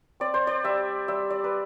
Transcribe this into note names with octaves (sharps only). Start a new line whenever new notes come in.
C4 D5
C5
D5
G3 E5
G3 E5
D5
B4